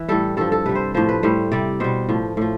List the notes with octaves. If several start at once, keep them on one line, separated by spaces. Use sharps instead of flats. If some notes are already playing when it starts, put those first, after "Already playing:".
Already playing: E3 B4
A2 G3 A4
G2 F3 A4
A4
C3 G3 B4
C5
A2 F3 C5
B4
A2 G3 C5
C3 G3 D5
B2 G3 C5
A2 F3
A2 F3